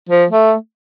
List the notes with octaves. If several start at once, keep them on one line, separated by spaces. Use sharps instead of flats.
F3
A3